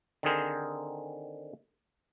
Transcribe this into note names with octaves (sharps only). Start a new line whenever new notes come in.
D3 D#3 C4 G#4 A#4 C5